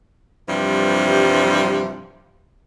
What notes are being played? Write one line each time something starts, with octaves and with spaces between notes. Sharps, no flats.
G2 C3 E3 F3 G3